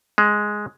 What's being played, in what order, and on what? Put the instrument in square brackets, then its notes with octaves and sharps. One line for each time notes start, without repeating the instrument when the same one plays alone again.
[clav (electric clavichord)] G#3